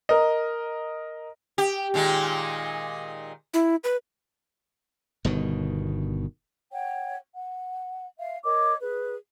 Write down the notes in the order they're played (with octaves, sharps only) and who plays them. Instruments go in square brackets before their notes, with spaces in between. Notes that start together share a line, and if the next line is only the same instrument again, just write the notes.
[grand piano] A#4 D#5
[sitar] G4
A#2 D#3 G#3
[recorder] E4
B4
[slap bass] G1 B2 D#3
[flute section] C#5 F#5 G5
F#5
E5 F5
A#4 C#5 D#5 D6
G#4 B4